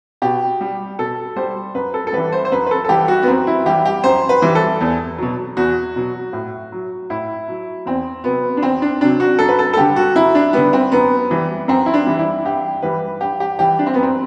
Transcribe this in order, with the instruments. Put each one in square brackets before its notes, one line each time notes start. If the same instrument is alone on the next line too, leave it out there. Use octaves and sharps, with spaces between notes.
[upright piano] B2 G4
G3
B2 A4
G3 C5
F#2 B4
A4
A4
E3 G3 B4
C5
C5
F#2 B4
B4
A4
A4
E3 G3 G4
F#4
B3
F#2 C4
E4
E3 G3 G4
G4
F#2 C5
B4
E3 G3
A4
E2
B2 F#3
E2 F#4
B2 F#3
A2
F#3
A2 E4
F#3
E2 C4
C3 F#3 B3
D4
E2 C4
D4
C3 F#3 D4
F#4
F#2 A4
B4
A4
A4
D3 G3 G4
F#4
F#2 E4
D4
D3 G3 B3
C4
F#2 B3
E3 G3
F#2 C4
E4
D4
E3 G3
E4
G2 G4
E3 G3 B4
G2 G4
G4
E3 G3 G4
D4
C4
B3
F#2
C4